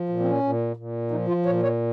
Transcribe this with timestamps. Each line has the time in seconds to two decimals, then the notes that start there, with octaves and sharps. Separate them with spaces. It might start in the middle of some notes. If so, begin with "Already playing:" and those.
Already playing: F3
0.09 A#2
0.20 C4
0.25 C#4
0.43 A#2
0.77 A#2
1.11 F3 D#4
1.28 F4
1.45 A#2 C#5
1.63 C#5